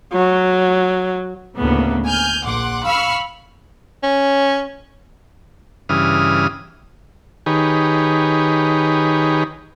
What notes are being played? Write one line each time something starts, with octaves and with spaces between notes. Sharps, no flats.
F#3
D2 A2 C#3 A#3 B3
G#5 F6 G6
A#1 F#5 C6 D6
F5 B5 C#6 E6 F6
C#4
G2 C#3 E3 D#6 F6
D#3 D#4 G4 G#4 B4 C#5